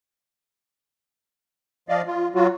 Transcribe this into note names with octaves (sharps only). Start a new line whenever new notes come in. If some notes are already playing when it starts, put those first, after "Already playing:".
F3 D5 D#5 F5
F4
F#3 F4 F#4